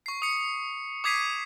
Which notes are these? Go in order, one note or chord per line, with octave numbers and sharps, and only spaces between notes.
C#6 C7
D#6 C#7
D6 D#6 G#6 B6 C7 D#7